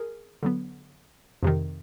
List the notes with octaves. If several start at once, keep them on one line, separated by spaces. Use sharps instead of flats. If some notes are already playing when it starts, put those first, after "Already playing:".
Already playing: G#4 A#4
D3 F#3 B3
F2 C3 D#3